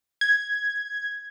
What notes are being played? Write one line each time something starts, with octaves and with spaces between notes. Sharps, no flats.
G#6